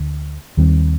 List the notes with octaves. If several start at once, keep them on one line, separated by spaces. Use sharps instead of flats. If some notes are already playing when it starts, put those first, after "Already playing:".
Already playing: D2 D3
D#2 D#3 G3 C4